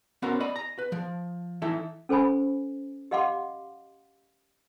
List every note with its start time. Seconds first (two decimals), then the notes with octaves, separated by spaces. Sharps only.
0.22 B3 C#4 F#4 A4 A#4 C5
0.40 D5 D#5 B5
0.56 A#5
0.79 B4
0.92 F3
1.62 E3 D#4 E4 A4 E5
2.09 C#4 A4 C5 G#5 B5
3.11 G4 D#5 F5 F#5 C6 D6